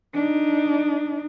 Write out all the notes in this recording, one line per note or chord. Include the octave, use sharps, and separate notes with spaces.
D4 D#4